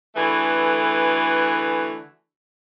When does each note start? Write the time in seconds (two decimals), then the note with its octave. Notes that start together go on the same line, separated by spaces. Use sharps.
0.16 D3 E3 A3 F#4 G#4 B4